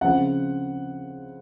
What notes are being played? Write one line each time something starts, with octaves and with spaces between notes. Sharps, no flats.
C#3 F3 C4 F#5